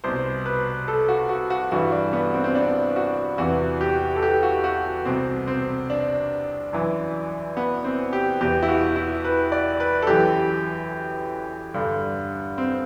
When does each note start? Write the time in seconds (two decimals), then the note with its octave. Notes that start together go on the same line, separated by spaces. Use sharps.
0.04 C2 B2 C5
0.46 B4
0.88 A4
1.09 F#4
1.29 F#4
1.50 F#4
1.72 G2 E3 F#4
1.92 D4
2.13 B3
2.34 C4
2.44 C4
2.55 D4
2.96 F#4
3.38 E2 C3 E3 F#4
3.81 G4
4.16 A4
4.23 G4
4.43 F#4
4.64 F#4
5.05 C2 B2 C4
5.47 C4
5.90 D4
6.73 F#2 E3
7.57 B3
7.84 C4
8.13 G4
8.41 E2 B2 G4
8.62 E4
8.69 F#4
8.96 E4
9.24 B4
9.52 D5
9.80 B4
10.02 A4
10.07 F#2 E3 G4
11.74 G2 D3
12.58 C4